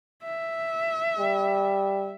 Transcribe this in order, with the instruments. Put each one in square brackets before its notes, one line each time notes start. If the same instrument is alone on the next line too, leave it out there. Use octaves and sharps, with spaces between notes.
[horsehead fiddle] E5
[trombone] G3